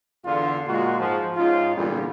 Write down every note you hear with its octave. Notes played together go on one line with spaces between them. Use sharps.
E2 D3 F4
A#2 G#3 A#3 F4 F#4
G#2 F3
G#2 C#4 F4
E2 G2 A#2 D3 G3